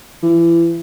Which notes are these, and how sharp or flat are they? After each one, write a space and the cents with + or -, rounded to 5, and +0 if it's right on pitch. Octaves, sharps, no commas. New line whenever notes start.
E3 +30